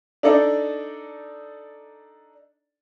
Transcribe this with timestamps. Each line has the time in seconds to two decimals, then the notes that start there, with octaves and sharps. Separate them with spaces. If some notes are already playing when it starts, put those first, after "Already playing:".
0.23 D4 D#4 A4 D5